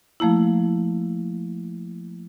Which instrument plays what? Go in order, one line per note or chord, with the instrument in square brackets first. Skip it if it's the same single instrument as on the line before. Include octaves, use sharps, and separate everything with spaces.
[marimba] F3 A3 A#3 E4